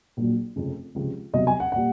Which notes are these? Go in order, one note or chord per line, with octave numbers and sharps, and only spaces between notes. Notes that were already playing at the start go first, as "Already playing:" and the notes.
A#1 A#2 F#3
F1 F2 C#3
C#2 C3 F3
C2 B2 F#3 D#5
G#5
F#5
A#2 G3 F#5